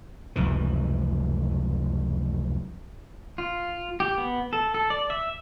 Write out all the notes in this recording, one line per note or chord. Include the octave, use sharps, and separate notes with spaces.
F1 C#2 F#2 E3
F4
G4
B3
A4
A4
D5
E5